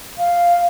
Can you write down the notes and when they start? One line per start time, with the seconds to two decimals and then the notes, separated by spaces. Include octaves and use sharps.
0.18 F5